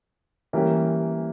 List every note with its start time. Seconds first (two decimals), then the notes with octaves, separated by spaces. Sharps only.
0.53 E3 G3 A#3 C#4 G4